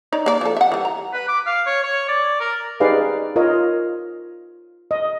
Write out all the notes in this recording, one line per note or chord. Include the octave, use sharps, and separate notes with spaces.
D#4 C#5 D5
A#3 D5
F3 A4
E5 F#5
E3 G3
A#5
B4
D6
F5
C#5
C#5
D5
A#4
D#4 G4 G#4 B4 D5 F5
F4 A#4 C#5 D#5
D#5